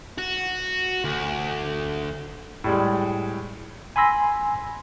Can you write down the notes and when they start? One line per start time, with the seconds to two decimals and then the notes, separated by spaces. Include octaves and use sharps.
0.18 F#4
1.04 D2
2.64 A2 G3 G#3
3.96 G#5 B5 C6 E6 A#6